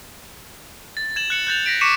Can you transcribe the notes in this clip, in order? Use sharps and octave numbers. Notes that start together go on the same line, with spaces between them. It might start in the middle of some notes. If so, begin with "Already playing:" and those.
A6
G#6 E7 F#7
F#6 C#7 F#7
F#6 G6 A6 F7
A#6 B6 D7
C#6 D6 B6 C#7 D#7 E7